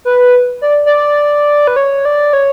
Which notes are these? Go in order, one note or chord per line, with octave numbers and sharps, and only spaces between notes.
B4
D5
D5
B4
C#5
D5
C#5